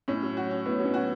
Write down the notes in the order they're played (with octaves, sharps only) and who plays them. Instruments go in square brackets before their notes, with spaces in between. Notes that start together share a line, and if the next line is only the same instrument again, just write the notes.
[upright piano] A2 [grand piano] C#4
[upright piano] F#3
F#4
C#4
[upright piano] A2 [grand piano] B3
[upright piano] F#3
[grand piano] C#4
[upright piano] F#4